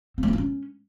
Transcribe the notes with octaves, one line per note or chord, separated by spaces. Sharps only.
C4
A3
C#4
F4
C#4